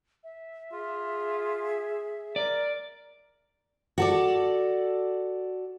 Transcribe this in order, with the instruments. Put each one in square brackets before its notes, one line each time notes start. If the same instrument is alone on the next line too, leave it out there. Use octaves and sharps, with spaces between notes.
[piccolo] E5
[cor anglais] F4 [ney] G#4
[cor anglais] A#4 [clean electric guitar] D5
[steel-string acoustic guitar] F#4 A4 D5